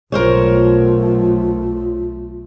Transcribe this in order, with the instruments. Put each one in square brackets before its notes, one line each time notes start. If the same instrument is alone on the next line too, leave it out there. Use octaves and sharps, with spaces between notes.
[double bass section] B1 A3 [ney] F4 [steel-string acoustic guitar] A#4 C5 C#5